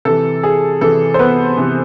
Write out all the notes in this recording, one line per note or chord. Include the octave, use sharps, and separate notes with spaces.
C3 E3 A4
G#4
C3 E3 A4
C5
B3 B4
C3 E3